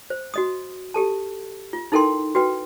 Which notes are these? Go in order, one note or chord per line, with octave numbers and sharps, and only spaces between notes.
C5
F#4 D#5 D#6
G4 A4 A5
F4
D#4 E4 A4 A#4 G5 C6
F#4 B4 G5